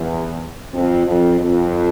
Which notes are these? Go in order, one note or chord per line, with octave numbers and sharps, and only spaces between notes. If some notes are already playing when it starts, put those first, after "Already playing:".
Already playing: E2
F2
F2
F2